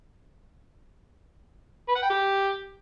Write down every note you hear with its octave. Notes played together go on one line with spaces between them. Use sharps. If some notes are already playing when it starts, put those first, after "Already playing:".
B4
F#5
G5
G4